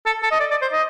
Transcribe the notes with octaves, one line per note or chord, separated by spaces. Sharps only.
A4
A4
D#5
D5
D5
C5
D#5